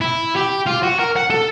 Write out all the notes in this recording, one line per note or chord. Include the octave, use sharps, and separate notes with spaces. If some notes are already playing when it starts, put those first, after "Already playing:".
E4
G4
F4
F#4
A#4
F#5
A4